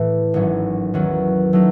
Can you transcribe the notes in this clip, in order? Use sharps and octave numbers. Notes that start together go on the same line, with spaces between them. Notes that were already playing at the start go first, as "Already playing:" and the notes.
Already playing: A2 E3 A3
G#1 G#2 F#3 C#4
E2 D#3 F#3 C#4
F#3 A3 D#4